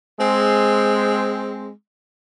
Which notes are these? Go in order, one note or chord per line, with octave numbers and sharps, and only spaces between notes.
G#3 C4